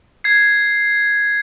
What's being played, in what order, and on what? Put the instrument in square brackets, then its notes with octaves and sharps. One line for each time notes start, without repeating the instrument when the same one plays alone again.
[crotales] G#6 C7